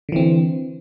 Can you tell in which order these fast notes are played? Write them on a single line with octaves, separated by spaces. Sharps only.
D3 E3 C4